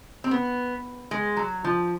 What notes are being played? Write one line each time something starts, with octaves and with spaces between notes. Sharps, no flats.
C4
B3
G#3
F#3
F3